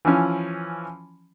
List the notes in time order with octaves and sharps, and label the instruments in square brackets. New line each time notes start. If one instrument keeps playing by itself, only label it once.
[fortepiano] E3 F3 C#4